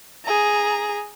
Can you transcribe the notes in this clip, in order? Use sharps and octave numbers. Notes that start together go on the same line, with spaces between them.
G#4 A#5